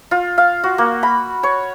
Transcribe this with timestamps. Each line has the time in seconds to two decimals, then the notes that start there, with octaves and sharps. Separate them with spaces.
0.11 F4
0.38 F5
0.63 F#4
0.78 A#3
1.03 B5
1.43 C#5